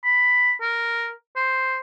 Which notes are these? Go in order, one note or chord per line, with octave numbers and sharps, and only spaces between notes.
B5
A#4
C5